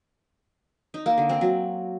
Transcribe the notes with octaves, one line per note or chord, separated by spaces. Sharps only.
D#4
A#3
D3
C4
F#3